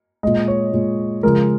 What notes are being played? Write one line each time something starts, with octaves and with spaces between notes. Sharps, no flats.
A#2 G#3 D#5
C#5
A#2 G#3
C#3 F3 G#3 A#4